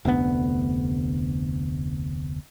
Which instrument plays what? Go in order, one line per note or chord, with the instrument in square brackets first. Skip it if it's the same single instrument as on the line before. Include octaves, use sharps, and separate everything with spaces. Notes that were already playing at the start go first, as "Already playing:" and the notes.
[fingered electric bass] F1 D2 D3 B3